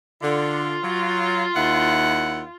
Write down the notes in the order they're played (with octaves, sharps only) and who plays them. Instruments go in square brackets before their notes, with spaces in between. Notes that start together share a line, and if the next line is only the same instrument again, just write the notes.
[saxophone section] D3 [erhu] F4
[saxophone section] F#3
D#2 E4 F#5